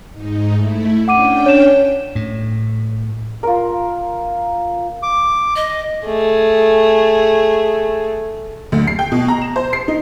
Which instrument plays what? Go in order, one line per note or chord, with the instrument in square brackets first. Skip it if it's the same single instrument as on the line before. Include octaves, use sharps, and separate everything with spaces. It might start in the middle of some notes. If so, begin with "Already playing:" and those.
[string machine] G#2 D#4
A3 E4
[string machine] C#4 D4 G5 [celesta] F#5 D6 D#7
[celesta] C#5 E7
[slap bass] A2
[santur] F4 A#4
[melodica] D6
[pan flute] D#5
[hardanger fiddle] A3 G#4
[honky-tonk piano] D2
C7
G5
B2
A#5
E7
C5
C7
D#4